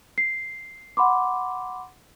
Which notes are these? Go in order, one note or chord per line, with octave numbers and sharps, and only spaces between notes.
C7
F#5 B5 C6 D6